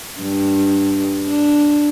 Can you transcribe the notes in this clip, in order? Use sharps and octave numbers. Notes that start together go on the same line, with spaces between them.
G2
D4